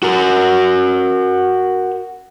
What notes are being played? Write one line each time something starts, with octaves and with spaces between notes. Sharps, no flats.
F#4 A#4